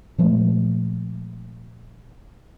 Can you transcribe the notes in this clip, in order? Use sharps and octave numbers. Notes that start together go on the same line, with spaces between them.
A#2 F3 G#3 A3